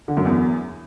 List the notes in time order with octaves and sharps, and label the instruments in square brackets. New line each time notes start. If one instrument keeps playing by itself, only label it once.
[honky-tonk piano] D3
F#2
E2